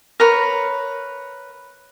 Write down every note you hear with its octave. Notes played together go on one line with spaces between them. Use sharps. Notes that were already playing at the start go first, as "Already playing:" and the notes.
A#4 B4 C#5